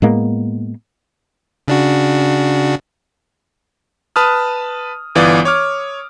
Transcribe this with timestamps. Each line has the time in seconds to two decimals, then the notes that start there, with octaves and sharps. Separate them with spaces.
0.02 A2 G#3 A#3 B3
1.68 C#3 D4 F#4
4.16 B4 A5 D#6 F6
5.15 G1 E3 B3 F4 D5 D#6
5.45 C#5 D6 F6